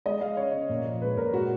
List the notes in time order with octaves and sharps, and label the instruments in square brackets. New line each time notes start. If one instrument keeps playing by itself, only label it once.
[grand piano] G#3 D#5
G#3 F5
C#3 C#5
C#3
A#2
F3
G#3 B4
A#2 A#4
G#3 F#4